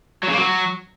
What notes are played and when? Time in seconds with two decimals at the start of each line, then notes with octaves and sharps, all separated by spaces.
0.23 F#3
0.28 C#3
0.33 A#3
0.38 F#3